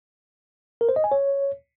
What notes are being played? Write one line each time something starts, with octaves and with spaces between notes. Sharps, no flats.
A#4
C5
D#5
G#5
C#5